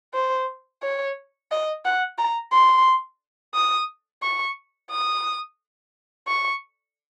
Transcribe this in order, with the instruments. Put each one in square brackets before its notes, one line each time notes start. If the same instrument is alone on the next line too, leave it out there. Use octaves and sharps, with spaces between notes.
[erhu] C5
C#5
D#5
F#5
A#5
C6
D#6
C#6
D#6
C#6